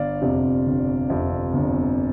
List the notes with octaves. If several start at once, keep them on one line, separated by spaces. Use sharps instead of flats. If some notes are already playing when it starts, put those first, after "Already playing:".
Already playing: G1 D5 F5
F2 C3
G1
F2 C3
G1